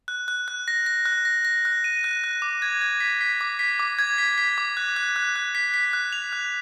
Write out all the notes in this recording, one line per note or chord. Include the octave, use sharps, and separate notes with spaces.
F#6
F#6
F#6
A#6
A#6
F#6
A#6
A#6
F#6
D#7
F#6
F#6
D6
G#6
G#6
B6
B6
D6
B6
D6
G#6
B6
B6
D6
F#6
F#6
F#6
F#6
B6
B6
F#6
F7
F#6